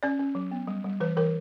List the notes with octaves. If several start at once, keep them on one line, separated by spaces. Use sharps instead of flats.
C#4 D5
C#4
F#3
B3
G3
G3
E3 B4
E3 A#4